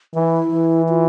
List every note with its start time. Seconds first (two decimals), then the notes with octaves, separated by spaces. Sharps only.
0.14 E3 E4
0.51 E3
0.89 F4